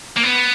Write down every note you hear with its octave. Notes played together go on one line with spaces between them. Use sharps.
A#3
B3